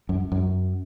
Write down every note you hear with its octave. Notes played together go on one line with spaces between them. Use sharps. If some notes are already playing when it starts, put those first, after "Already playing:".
F#2
F#2